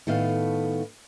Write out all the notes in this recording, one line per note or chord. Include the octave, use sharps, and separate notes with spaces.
A2 D#3 A3 B3 F5